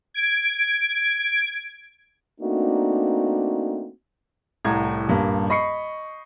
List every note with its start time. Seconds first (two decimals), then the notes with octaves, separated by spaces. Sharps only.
0.14 G#6 D7
2.41 A3 A#3 C4 D4 D#4 F#4
4.65 C2 A2 A#5 G#6
5.08 D#1 G2 A#3
5.50 D#5 B5 C#6 C7 C#7